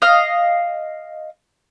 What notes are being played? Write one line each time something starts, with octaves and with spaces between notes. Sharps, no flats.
D#5 F5